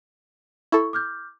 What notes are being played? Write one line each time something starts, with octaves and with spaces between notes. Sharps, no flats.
E4 A4 C#6
D6 F6 G6